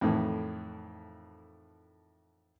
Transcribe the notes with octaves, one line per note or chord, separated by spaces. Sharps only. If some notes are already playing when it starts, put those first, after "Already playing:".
F2 A2 D#3 E3